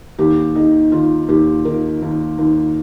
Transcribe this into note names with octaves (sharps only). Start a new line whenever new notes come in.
D#2 G4
D#3 D#4
D#3 F4
D#2 G4
D#3 A#4
D#2
D#2